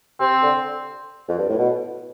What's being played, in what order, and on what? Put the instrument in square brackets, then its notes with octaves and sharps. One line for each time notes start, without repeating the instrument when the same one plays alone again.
[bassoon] C3 [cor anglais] C4
[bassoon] D3
F2
G2
A2
B2